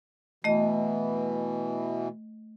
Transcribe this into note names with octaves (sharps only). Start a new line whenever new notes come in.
B2 E3 A3 D#5